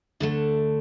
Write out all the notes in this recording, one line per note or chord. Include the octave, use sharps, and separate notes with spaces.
D2 D3 A3 D4